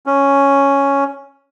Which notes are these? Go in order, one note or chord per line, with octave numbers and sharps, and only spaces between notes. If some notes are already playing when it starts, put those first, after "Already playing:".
C#4